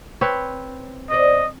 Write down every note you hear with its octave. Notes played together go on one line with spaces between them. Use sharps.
C4 B4 C#5
B2 C5 D5 D#5